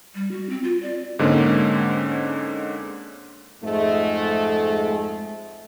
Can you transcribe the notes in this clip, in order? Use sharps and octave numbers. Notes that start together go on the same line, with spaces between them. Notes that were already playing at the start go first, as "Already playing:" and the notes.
G3
F#4
C4
F4
D5
G#2 D3 G#3 A#3 C4 C#4
F2 G#2 G#3 A3